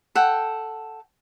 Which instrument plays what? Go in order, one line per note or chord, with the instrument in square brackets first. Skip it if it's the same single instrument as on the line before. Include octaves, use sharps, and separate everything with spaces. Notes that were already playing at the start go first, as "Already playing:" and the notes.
[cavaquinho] A4 F#5 G5